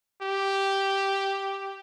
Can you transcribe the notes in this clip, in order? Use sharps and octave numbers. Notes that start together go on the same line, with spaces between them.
G4